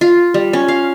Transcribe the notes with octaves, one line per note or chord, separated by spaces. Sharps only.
F4
G3
C#4
F5